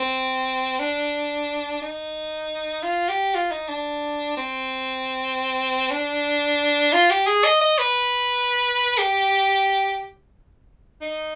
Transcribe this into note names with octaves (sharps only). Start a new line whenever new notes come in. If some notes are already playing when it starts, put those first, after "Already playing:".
Already playing: C4
D4
D#4
F4
G4
F4
D#4
D4
C4
D4
F4
G4
G#4
D#5
D#5
B4
G4
D#4